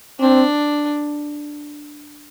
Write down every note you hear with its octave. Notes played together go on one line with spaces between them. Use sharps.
C4 D4